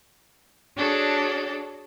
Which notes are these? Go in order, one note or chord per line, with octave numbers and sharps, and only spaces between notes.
D4 F#4 G#4 A4 C#5